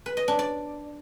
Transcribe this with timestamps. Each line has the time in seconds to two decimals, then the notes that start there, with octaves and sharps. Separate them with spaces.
0.06 B4
0.17 D#5
0.28 D4
0.39 D5